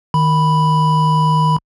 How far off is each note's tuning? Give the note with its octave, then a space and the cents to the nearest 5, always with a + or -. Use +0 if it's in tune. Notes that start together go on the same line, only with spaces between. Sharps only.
D#3 -5 B5 +0